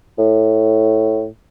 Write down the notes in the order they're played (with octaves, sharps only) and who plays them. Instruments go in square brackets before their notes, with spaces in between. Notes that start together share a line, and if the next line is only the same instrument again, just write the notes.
[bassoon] A2